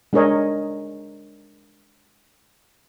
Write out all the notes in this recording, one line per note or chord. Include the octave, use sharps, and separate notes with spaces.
G#3 D4 G#4 A#4 C#5 D#5